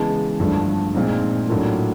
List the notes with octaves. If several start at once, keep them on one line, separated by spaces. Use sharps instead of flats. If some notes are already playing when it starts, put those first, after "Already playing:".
Already playing: C#3 E3 G#3 B3 A5
G2 D3 F3 A3 D4
A#2 F3 G#3 C4 D#4
A2 F#3 A#3 D4 F4